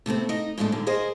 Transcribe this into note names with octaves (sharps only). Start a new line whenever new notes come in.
C3 A3 B3 C4
D#4 D#5
G#2 B2 F3 A3 D4
A#2 D3 D#3 G3
G#4 A#4 C5 D#5